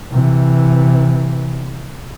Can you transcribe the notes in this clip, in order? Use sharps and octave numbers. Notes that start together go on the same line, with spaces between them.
C3 E3